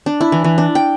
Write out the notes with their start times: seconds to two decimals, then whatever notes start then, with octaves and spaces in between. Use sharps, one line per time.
0.06 D4
0.21 E4
0.32 E3
0.44 E3
0.58 D4
0.75 G5